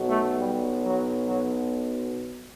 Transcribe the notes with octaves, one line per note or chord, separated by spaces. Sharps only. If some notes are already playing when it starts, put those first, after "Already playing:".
Already playing: B1 B2 F#3
A3
G3
F#3
F#3